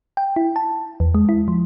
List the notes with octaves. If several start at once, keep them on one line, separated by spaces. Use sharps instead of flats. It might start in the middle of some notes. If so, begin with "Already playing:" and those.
G5
E4
A5
E2
G#3
E4
F3